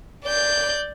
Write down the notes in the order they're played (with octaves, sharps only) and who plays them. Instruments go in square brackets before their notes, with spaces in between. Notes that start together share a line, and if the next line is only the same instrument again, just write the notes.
[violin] D5 G6